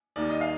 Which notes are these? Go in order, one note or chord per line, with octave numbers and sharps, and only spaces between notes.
D#2 D#3 G3 D5
D#5
F5